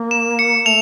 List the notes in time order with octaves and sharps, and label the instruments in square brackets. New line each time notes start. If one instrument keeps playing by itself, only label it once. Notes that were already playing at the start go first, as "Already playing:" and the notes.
Already playing: [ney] A#3
[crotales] E7
C#7
[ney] A3 [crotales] F7